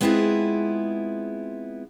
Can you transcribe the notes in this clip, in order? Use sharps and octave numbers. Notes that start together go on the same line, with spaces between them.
G#3 B3 C4 E4 F4 G#4